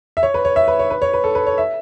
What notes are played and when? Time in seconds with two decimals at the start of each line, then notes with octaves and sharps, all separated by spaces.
0.17 E5
0.23 C#5
0.34 B4
0.45 C#5
0.56 E5
0.68 B4
0.79 C#5
0.90 B4
1.02 C#5
1.14 B4
1.24 A4
1.35 B4
1.47 C#5
1.58 E5